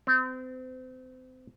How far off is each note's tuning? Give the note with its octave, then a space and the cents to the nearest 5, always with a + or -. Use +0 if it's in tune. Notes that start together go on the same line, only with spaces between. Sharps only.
C4 -35